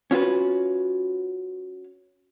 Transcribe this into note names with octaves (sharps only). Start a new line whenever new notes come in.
C#4 F4 F#4 B4